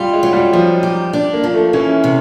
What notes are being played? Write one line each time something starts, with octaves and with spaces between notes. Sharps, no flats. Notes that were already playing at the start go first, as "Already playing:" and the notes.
Already playing: G3 F4
G#3
F#3
G3
F3 D#4
G4
D4
A#3
F3
A3
E3 C#4
C3